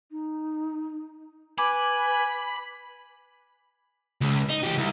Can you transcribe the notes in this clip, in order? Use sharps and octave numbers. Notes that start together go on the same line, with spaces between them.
D#4
B4 G#5 B5 D6
C#2
D#4
E3 G4
C2